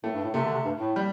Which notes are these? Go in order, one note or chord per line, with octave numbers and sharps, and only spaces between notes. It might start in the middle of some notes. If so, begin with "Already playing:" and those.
A2 A3
G2
A2
C3 A3
D3
C3
G2
A2
G3